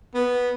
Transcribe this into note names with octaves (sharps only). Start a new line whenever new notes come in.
B3